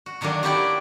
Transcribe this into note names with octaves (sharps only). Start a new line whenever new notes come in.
F#4
D3 D#3 F#3 A#3 D4
F#3 D4 E4 G4 D5